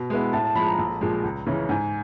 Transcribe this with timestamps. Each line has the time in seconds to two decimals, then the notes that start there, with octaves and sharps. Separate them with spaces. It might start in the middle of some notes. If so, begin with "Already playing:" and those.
Already playing: B2
0.10 G#3 B3 E4
0.33 A2 A5
0.44 A5
0.55 F3 G#3 B5
0.67 A#5
0.78 A#1
1.01 A#2 F3 G#3
1.24 C#2
1.46 C#3 E3 G#3 C#4
1.69 G#2 G#5